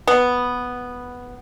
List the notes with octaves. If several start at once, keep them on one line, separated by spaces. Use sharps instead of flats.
B3